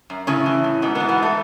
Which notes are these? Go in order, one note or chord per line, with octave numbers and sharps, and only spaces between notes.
F#2
A2 C#3 C#4
E3
A2
G#2 B2 B3
B2 B3
E3
B2 B3
G#2 A3 A4